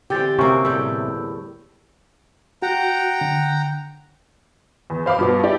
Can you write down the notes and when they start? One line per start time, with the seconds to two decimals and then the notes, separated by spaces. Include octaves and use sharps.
0.10 D3 E3 C4 G4 E6 G6 A6
0.39 C3 A#3 C4 C#4 F#4 C#6 E6
0.65 E2 A2 G3 E6 G6
2.62 F#4 F#5 G5 A#5
3.21 D3
4.90 E2
5.06 C5 F5 B5 D6
5.19 G2 B2 B3
5.43 E4 G4 D5